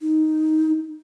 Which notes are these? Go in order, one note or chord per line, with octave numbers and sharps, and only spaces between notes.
D#4